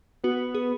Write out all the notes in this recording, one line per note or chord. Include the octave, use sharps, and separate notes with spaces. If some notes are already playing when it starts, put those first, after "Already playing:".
B3 F#4
G#4